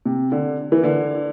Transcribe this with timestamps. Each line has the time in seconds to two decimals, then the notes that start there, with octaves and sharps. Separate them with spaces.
0.06 C3
0.32 D3
0.72 E3
0.84 D3